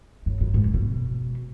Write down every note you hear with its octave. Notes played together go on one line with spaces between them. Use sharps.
F#2
F#2
G#2
B2